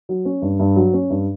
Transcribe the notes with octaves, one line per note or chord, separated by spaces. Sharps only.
F#3
C#4
G2
G2
F#3
C#4
G2